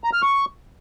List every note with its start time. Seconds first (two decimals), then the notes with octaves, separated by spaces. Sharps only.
0.04 A#5
0.13 F6
0.22 C#6